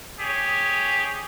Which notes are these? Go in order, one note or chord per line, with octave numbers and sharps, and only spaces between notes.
G4 G#4 C#5